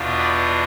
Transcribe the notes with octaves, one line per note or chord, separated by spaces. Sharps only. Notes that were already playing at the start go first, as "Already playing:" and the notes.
Already playing: E2 B2 B3 D4 F4
B4 D5